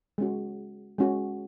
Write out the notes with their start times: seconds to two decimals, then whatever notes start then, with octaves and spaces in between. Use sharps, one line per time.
0.18 G#3 C#4 F#4
0.98 G#3 C#4 F#4